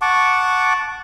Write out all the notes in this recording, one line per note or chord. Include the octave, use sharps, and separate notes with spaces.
F#5 A5 C#6 D6